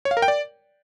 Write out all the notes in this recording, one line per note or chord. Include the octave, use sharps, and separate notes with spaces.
C#5
F5
A#4
G5
D5